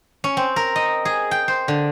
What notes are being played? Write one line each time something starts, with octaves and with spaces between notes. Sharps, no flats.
C#4
C4
A#4
D#5
G#4
G5
C5
D3